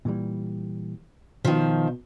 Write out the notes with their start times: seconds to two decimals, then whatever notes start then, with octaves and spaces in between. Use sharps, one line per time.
0.05 A#2 E3 G3
1.45 B2 D#3 F3